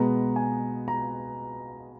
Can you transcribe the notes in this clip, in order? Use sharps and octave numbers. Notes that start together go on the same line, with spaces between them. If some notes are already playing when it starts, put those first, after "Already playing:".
Already playing: B2 G#3 B3 A#5
G#5
A#5